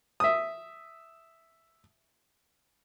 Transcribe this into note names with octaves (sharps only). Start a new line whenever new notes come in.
E5 D#6